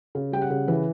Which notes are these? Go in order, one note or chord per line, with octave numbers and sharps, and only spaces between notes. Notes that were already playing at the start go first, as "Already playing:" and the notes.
C#3
G3 G5
F#5
C#3
E3 B4